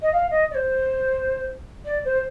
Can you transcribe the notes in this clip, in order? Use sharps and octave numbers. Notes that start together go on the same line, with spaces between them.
D#5
F5
D#5
D5
C5
D5
C5